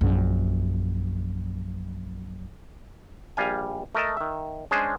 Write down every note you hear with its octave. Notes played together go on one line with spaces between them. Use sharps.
A#1 F#2
A#1 G3 F5 G#5
A3 A#4 D#5 A5
D#3 E5
G#3 C#4 D4 G#4 C5